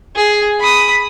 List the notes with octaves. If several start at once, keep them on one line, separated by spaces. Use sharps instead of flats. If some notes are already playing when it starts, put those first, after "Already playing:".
G#4
B5 D#6